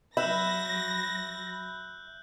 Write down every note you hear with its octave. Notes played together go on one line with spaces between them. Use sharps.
F#3 E5 B5 E6 F#6 G6 A#6